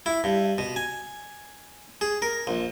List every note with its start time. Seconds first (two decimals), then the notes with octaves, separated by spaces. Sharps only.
0.06 E4
0.24 G2
0.58 B2
0.76 G#5
2.01 G#4
2.22 A#4
2.47 A#1